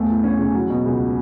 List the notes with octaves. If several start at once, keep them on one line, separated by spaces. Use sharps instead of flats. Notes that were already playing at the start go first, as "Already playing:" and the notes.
Already playing: E2 A3
E3
C#4
C#3
F#3
B2
C#2